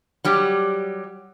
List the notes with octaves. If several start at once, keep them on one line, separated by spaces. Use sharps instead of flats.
F#3 G3 G4